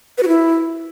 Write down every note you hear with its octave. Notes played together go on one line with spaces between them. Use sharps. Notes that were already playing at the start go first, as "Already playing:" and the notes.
B4
F#4
E4